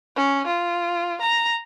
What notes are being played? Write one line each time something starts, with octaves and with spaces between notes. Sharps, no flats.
C#4
F4
A#5